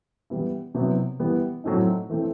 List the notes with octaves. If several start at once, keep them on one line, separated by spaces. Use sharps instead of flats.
E3 G3 B3 E4
C3 F#3 B3 E4
E3 G3 B3
A2 F#3 A3 C4 D#4
E3 A3 C4